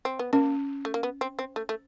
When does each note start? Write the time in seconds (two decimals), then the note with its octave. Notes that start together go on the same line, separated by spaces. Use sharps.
0.05 C4
0.19 B3
0.33 A#3 C#4
0.85 A3
0.94 A#3
1.03 B3
1.21 C4
1.39 C4
1.56 A3
1.69 A3